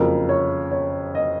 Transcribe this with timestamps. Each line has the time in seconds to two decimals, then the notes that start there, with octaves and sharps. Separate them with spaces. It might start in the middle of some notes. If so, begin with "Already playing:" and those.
Already playing: F#1 F2 C#3 F#3 A#4
0.29 C#5
0.72 C#5
1.15 D#5